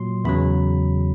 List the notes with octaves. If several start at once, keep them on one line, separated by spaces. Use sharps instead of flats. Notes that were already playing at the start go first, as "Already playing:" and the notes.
Already playing: A#2 F#3 C6
E2 C#3 F#3 B5